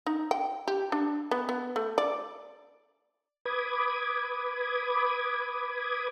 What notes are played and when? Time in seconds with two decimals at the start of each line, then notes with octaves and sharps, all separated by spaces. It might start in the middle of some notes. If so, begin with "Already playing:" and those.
0.06 D#4
0.31 G5
0.68 G4
0.92 D4
1.31 B3
1.49 B3
1.76 A3
1.98 D5
3.45 B4 B5 D6 D#6 G#6